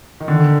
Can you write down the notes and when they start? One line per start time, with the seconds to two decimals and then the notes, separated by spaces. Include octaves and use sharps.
0.20 D#3
0.28 D3